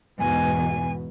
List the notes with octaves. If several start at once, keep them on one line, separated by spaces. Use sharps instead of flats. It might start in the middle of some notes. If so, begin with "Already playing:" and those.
E2 G#2 B2 G#5